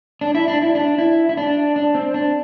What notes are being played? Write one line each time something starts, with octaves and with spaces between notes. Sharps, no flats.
D4
E4
D4
E4
D4
E4
E4
D4
D4
C4
D4